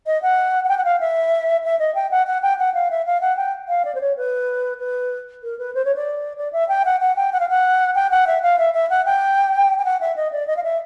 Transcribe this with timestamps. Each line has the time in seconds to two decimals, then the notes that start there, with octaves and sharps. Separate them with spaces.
0.06 D#5
0.22 F#5
0.64 F#5
0.68 G5
0.77 F#5
0.84 F5
1.00 E5
1.63 E5
1.79 D#5
1.94 G5
2.11 F#5
2.26 F#5
2.42 G5
2.58 F#5
2.74 F5
2.90 E5
3.06 F5
3.21 F#5
3.36 G5
3.68 F5
3.84 D5
3.94 C5
4.00 C#5
4.16 B4
4.79 B4
5.43 A#4
5.58 B4
5.74 C5
5.84 C#5
5.95 D5
6.37 D5
6.52 E5
6.68 G5
6.85 F#5
7.00 F#5
7.16 G5
7.32 F#5
7.39 F5
7.49 F#5
7.95 G5
8.10 F#5
8.27 E5
8.42 F5
8.58 E5
8.73 E5
8.89 F#5
9.05 G5
9.78 G5
9.84 F#5
10.00 E5
10.16 D#5
10.32 D5
10.47 D#5
10.56 F5
10.63 E5